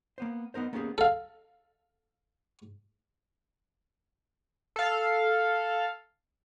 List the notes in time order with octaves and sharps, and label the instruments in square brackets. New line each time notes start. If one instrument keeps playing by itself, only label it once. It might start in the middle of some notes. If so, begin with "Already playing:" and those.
[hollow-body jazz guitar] A#3 B3 C5
B3 D#4 A#4 C5
A#3 B3 C#4 F4 G4 G#4
[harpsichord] A4 F5
[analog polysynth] A4 F5